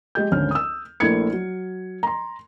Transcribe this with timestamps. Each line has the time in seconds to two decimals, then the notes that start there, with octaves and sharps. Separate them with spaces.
0.15 G#3 G4 G6
0.31 G#1 D2 C#4 F6
0.51 D#6 E6
1.00 A#1 A3 E4 A#4 G#6 C#7
1.33 F#3
2.03 A#5 C6